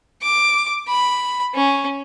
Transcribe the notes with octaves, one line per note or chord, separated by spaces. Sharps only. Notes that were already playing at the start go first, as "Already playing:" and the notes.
D6
B5
C#4